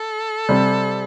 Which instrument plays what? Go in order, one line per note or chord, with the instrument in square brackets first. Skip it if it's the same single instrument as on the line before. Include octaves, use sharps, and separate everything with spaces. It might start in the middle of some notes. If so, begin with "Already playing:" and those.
Already playing: [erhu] A4
[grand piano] C3 G3 C4